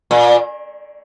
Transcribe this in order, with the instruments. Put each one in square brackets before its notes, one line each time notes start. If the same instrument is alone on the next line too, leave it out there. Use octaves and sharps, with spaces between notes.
[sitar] A#2